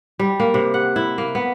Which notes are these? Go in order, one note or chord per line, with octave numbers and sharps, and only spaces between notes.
G3
A#3
C3
F#5
E4
A#3
B3